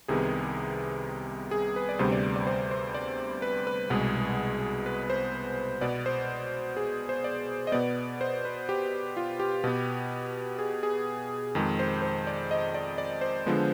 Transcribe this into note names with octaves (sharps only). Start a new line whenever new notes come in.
C2 C3 D#3 G3 B3 G#4
G#4
B4
D5
D2 C3 G3 B3 C5
D5
D5
C5
C5
D5
B4
B4
C2 B2 G#3 B3 G#4
B4
B4
C5
B2 B3 D5
C5
G#4
C5
D5
D#5
B2 B3 D5
C5
B4
G4
F4
G4
B2 B3
G#4
G#4
F2 D#3 G#3
C5
C5
D5
D#5
D5
D5
C5
D3 F3 G#3 B3